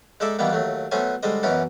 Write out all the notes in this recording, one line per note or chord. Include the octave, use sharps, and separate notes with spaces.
G#3 D#4 A4 D5 E5
B2 D#3 E3 G3 A#3 B3
D#2 F#3 A3
F#3 A3 B3 C#4 C5 G#5
D3 G3 G#3 C5 D#5
F#2 B2 E3 B3 C#4 D#4